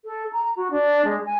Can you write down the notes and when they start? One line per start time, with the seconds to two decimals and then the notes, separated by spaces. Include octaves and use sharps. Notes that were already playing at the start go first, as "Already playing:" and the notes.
0.05 A4
0.33 A#5
0.57 F#4
0.71 D4
1.05 G#3
1.26 G#5